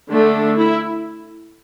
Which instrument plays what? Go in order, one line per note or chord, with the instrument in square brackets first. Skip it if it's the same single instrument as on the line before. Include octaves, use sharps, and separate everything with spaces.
[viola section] D3 A3 D4
E4